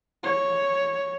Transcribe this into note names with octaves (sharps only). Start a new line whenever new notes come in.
C#5